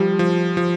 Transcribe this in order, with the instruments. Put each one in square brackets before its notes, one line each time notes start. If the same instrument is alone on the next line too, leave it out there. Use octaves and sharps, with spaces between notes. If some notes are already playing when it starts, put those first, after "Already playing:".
Already playing: [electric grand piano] F3 [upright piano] G3
[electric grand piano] F3
F3